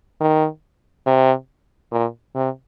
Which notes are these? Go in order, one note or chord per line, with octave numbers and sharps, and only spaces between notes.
D#3
C3
A#2
C3